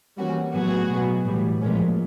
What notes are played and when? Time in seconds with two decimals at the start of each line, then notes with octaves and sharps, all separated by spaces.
0.17 E3 G3 A#3 C#4 F#4
0.53 A2 F#3 B3 F#4 G#4
0.90 B2 F#3 B3
1.25 A2 E3 G3
1.61 A#2 F3 G#3 C#4